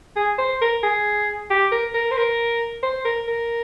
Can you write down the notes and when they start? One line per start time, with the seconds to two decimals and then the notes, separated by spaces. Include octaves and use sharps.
0.16 G#4
0.38 C5
0.61 A#4
0.83 G#4
1.50 G4
1.72 A#4
1.94 A#4
2.11 C5
2.17 A#4
2.83 C5
3.05 A#4
3.28 A#4